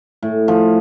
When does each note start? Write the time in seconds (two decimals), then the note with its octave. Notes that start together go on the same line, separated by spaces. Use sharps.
0.22 A2
0.48 F3